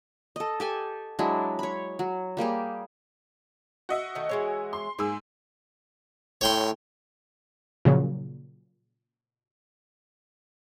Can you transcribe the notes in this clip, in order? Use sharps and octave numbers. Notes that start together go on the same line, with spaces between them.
A4 D#5
G4 A4 G#5
F#3 G#3 D4 E4
C#5 B5
F#3
G3 A#3 G4 G#4
F#4 D#5 E5
D#3 A3 D#4
E3 G#3 C#5
C6
G#2 A#3 G#4 E6
A2 C#5 G5 C6
A#2 C#3 F3 F#3